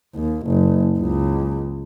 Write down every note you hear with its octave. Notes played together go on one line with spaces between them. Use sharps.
D#2
F#1
C#2